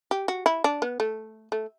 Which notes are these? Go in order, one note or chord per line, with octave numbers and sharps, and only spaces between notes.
G4
F#4
E4
D4
B3
A3
A3